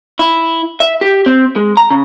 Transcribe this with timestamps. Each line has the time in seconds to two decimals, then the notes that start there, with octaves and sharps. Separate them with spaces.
0.19 E4
0.80 E5
1.01 G4
1.26 C4
1.56 G#3
1.77 A#5
1.91 C#3